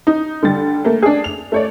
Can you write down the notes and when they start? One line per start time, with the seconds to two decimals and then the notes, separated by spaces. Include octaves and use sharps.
0.07 D#4
0.43 D3 G3 A6
0.85 A3 A#3
1.03 D4 G#4
1.24 F7
1.52 A3 C#5 D5